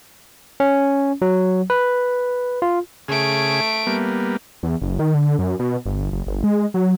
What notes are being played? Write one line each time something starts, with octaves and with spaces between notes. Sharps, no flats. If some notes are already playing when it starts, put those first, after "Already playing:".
C#4
F#3
B4
F4
C#3 A3 G#4 D7
G3 A#3 B3
E2
F#1
D#3
D3
F#2
B2
G1
F#1
G1
G#3
F#3